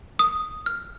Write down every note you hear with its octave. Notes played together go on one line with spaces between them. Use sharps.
D#6
F6